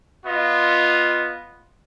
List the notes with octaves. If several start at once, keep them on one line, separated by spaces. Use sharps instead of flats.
B3 F4 D#5